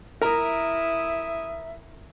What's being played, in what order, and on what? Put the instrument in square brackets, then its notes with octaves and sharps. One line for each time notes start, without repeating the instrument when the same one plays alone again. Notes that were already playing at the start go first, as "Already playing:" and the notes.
[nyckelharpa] E4 D#6 [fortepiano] A#4 [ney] E5 [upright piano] A#5